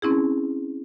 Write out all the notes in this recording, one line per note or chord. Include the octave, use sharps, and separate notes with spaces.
C4 C#4 E4 G#4